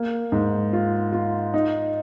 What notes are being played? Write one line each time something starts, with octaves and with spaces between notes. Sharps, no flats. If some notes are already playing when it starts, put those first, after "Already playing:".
Already playing: A#3
G#2
F4
F4
D#4